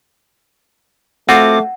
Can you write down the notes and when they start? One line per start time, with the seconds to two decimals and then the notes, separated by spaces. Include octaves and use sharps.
1.29 A3 C4 F4 F#4 F#5 D6